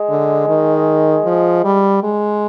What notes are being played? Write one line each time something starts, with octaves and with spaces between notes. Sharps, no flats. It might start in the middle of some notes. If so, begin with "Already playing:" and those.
Already playing: G#3
D3
D#3
F3
G3
G#3